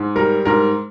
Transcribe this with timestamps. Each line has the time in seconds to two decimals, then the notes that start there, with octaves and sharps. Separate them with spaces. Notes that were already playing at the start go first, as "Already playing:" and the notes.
Already playing: G#2
0.16 G3 A#4
0.45 G#2 A#4